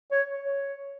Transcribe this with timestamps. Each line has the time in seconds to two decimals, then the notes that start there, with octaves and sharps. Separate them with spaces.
0.11 C#5
0.44 C#5